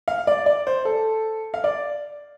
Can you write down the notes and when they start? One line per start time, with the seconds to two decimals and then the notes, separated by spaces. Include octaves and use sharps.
0.08 F5
0.27 D5
0.46 D5
0.67 C5
0.85 A4
1.54 F5
1.64 D5